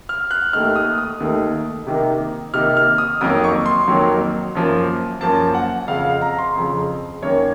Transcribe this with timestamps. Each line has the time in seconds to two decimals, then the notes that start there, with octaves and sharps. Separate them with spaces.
0.09 F6
0.31 F#6
0.53 D#2 D#3 A3 D#4 F6
0.76 D#6
0.98 D#6
1.20 D#2 D#3 A3 D#4
1.87 C3 D#3 A#3 D#4
2.54 C3 D#3 A#3 D#4 F6
2.77 F6
2.98 D#6
3.21 F2 D#3 F#3 A#3 D#6
3.44 C#6
3.66 C6
3.88 F2 D#3 F#3 A#3
4.55 F#2 F3 A#3
5.21 F#2 F3 A#3 A5
5.54 F#5
5.88 F2 C#3 F3 F5
6.05 F5
6.21 A#5
6.38 C6
6.55 F2 C#3 F3
7.22 F#2 D#3 A#3 C#4 C#5